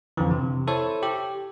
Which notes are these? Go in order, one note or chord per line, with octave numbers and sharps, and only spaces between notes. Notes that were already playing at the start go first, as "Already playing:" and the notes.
F2 D3 E3
C3
E4 A4 C5 C#5
G4